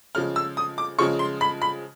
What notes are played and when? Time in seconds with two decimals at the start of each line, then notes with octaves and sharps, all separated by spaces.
0.15 C#3 F3 G#3 F6
0.36 E6
0.57 D#6
0.78 D6
0.99 C#3 F3 G#3 C#6
1.19 C6
1.41 B5
1.62 B5